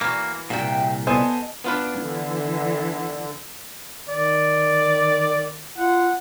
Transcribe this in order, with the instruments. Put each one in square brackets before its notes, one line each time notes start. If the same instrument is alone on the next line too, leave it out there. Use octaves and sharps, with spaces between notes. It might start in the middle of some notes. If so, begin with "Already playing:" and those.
[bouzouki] E3 F#4 [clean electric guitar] A#3
[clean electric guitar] C2 F#2 A#2 [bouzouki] F#4 E5 G5
[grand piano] B3 C5 G#5 [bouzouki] A4 D#5 A5
[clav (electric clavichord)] B3 F4 B4 [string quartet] D4
[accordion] D3 [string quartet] E3
[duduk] D#3 [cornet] D5
[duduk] F4 [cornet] F#5